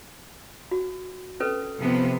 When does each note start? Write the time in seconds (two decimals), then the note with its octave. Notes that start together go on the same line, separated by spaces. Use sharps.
0.71 F#4
1.40 C#4 A4 B4
1.81 C3 F3 B3